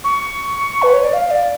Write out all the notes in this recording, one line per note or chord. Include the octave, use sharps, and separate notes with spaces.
C#6
B4
C#5
D5
F5
D5